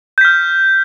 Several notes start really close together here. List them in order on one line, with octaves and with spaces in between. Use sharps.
G6 B6 F6